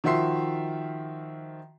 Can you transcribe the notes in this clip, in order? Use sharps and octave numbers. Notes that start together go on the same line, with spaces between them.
D#3 F3 F#4 E5 C6 C7